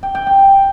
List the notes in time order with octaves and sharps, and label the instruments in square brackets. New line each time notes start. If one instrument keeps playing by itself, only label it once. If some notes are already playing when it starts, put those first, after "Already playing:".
[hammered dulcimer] G5
G5
G5